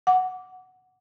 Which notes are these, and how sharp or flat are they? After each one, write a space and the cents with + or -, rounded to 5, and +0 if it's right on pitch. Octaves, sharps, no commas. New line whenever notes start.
F#5 +0 D6 -20